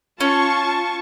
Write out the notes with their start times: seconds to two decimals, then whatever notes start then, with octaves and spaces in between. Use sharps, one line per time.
0.20 C#4 F4 A5 C#6